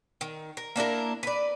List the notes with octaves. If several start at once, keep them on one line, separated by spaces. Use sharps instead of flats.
D#3
A#4
A#3 D4 E4 A#4
B4 D5